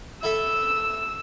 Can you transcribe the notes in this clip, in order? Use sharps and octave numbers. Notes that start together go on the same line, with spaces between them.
E4 A4 E5 E6